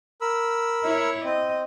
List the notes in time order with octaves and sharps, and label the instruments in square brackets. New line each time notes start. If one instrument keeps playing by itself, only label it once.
[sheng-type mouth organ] A#4 B5 E6
[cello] E4 C#5
[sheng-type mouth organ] C4 [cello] D#5